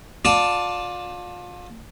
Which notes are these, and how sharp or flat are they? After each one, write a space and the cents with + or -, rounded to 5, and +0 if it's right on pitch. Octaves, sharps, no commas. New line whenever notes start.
F4 +30 D5 +0 A5 +0